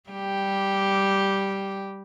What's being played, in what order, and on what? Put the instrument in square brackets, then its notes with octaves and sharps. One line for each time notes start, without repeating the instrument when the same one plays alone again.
[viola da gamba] G3 G4